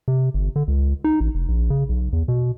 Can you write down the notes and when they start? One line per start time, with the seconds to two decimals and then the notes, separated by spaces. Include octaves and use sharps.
0.08 C3
0.34 G1
0.56 D3
0.68 C#2
1.04 D#4
1.21 A1
1.35 F1
1.49 A#1
1.70 C#3
1.89 B1
2.13 E2
2.28 B2